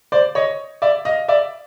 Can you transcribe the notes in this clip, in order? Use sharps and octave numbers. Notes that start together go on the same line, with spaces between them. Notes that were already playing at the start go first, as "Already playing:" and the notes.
C5 D5
C#5 D#5
D5 E5
D#5 F5
D5 E5